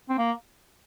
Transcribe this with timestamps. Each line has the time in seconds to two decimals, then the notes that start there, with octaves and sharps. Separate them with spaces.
0.09 C4
0.18 A#3